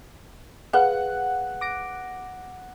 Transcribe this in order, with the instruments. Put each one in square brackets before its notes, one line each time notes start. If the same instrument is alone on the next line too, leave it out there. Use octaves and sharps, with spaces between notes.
[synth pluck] G#4 B4 F5 [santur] F#5
[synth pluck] D6 A#6 D7